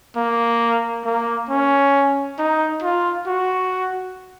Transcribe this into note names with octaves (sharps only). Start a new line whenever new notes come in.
A#3
A#3
C#4
D#4
F4
F#4